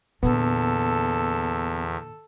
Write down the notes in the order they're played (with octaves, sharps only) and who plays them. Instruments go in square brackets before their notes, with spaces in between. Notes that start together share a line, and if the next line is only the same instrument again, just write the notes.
[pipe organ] E2 [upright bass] A#2 D3 [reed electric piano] B3 [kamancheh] A4